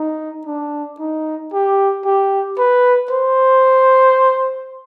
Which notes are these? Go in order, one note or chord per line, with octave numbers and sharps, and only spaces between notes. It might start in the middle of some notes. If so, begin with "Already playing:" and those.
Already playing: D#4
D4
D#4
G4
G4
B4
C5